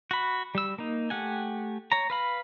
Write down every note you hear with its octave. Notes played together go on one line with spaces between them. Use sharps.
F#4 B5
G3 E6
A#3 D#4
A3 G4 F#5 G#5
C#5 A#5
B4 F5 B5